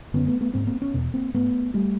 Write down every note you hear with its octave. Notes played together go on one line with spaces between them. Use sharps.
F#2 D3 B3 C#4
A3 B3
A3 B3
G#2 A#3 C4
A#3 C4
B3 C#4
E2 B2
A#3 C4
G#2 A3 B3
G3 A3